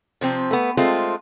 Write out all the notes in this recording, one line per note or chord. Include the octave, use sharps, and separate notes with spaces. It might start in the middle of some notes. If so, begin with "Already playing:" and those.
C3 F3 C4
A3 B3
G#3 A3 C4 F4